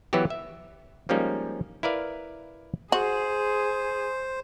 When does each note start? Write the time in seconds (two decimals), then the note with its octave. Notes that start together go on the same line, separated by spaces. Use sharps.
0.13 E3 F#3 B3 F#4 G4
0.30 E5
1.09 F3 G3 G#3 A#3 C#4 D#4
1.83 E4 A#4 B4 D5 F5
2.92 F#4 G#4 C5